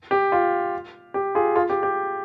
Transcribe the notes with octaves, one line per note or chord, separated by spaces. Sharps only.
G4
F4
G4
F4 G#4
F4 G#4
G4
G4